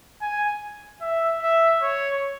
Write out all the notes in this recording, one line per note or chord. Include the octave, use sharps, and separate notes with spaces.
G#5
E5
E5
C#5